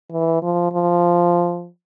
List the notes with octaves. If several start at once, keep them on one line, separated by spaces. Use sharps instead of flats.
E3
F3
F3